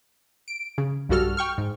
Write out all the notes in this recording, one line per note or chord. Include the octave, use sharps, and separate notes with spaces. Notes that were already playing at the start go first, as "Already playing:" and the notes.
D7
C#3
B1 G2 G3 F#4 A4 F6
G5 C#6 F6
G#2